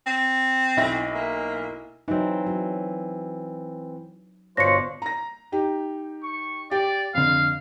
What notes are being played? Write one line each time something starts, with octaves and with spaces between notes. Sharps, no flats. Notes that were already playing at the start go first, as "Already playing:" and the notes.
C4
B1 E4 A#6
A#3
E3 F#3 C4 D#4
F#3
G1 B2 D4 F4 C5 C#5 A#6 C#7
A#5 A#6
D#4 G4
C#6
G4 D5 G5
F2 D3 F5